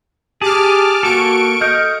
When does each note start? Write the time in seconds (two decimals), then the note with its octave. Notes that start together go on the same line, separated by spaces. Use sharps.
0.42 G4 G#4 A5 D6 F6
1.03 A#3 F#4 A4 C#6 D7
1.61 A4 D#5 F6 G6